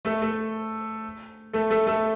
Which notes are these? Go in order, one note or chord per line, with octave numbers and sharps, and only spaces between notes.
A3 A4
A3 A4
A3 A4
A3 A4
A3 A4